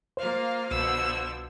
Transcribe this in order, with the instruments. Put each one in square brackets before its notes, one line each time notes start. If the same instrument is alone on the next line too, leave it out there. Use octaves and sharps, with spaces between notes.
[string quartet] A#3 F4 F5 [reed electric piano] C5
[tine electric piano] C2 [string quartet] B2 D3 F3 [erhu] E6